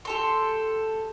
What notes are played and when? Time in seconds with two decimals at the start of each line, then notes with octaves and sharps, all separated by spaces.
0.05 G4 A4 C6